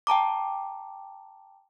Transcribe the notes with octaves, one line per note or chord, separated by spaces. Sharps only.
G5 A5 A#5 D6